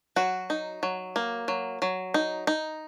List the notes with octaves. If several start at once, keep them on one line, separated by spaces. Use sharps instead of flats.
F#3 F#4
D#4
F#3
A#3
F#3
F#3
D#4
D#4